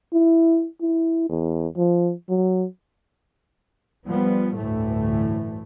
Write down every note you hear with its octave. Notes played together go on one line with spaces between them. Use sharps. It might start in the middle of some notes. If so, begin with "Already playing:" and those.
E4
E4
E2
F3
F#3
F3 G3 B3
G1 D2 A2 E3 A3